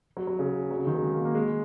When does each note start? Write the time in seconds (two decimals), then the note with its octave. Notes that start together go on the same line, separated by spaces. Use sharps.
0.17 F#3
0.27 F#3
0.39 C#3
0.71 F#3
0.79 C#3
0.87 D#3
0.95 F#3
1.02 G#3
1.14 A#3
1.25 A#3
1.35 G#3